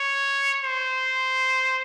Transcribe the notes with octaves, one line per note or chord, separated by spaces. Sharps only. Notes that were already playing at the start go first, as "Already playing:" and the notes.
Already playing: C#5
C5